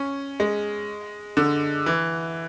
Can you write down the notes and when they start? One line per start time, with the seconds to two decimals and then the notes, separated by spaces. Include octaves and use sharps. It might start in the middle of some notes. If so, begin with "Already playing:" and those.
Already playing: C#4
0.40 G#3
1.37 D3
1.86 E3